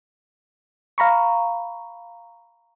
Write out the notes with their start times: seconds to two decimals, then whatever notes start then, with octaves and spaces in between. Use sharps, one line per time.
0.98 F5 A#5 B5 C#6